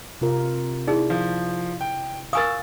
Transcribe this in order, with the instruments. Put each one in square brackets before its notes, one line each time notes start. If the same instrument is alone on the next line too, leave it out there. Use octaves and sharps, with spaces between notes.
[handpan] C3 F4 A#4
[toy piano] D#4 G#4 [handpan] E4 D5
[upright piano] F3
G5
[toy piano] A#4 G#5 D#6 [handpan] F5 [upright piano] C#6 E6 A6